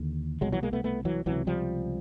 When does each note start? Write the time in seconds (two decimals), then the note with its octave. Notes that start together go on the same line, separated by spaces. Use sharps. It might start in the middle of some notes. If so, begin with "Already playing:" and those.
Already playing: D#2 D3
0.41 C2 F#3 G#3
0.46 B2
0.52 E3 F#3
0.63 G#3 A#3
0.73 A3 B3
0.84 A3 B3
1.05 E3 F#3
1.26 C#2 C3 E3 F#3
1.47 F3 G3